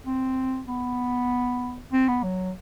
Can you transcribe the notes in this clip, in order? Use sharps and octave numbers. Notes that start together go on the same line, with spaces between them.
C4
B3
C4
B3
F#3